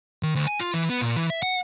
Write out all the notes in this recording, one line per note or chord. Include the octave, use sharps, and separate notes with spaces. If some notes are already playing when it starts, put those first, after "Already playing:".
D#3
D2
G#5
F4
E3
B3
A#2
E3
E5
F#5